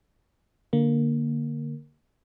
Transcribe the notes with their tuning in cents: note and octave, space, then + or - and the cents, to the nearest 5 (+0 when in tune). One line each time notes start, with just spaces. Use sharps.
D3 +0 A#3 +0